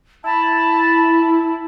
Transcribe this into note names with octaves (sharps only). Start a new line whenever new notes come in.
E4 A5 B5